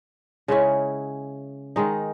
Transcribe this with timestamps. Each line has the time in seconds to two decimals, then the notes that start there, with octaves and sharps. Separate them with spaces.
0.48 C#3 G#3 C#4 E4
1.76 D#3 G#3 D#4